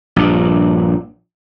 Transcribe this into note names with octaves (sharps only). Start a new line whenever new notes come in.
A#1 G2